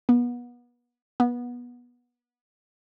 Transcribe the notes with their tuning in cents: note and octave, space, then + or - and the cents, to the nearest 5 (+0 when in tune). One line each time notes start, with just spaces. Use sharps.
B3 -30
B3 -20